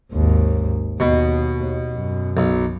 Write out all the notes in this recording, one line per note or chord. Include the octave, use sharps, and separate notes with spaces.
G#1 D#2
D#2 B2
F#2
B1